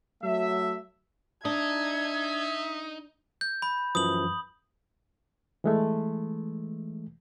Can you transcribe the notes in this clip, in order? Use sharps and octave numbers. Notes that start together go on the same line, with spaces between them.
F#3 A3 E5
D4 D#4 E5 G#6
G6
B5
F#2 E3 F3 D#6 F#7
E3 G#3 A3